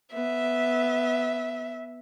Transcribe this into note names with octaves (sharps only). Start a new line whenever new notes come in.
B3 E5